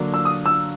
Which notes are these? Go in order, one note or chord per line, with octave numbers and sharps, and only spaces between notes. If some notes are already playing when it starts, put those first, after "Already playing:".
Already playing: D3 F#3 A#3 D4
E6
D#6
E6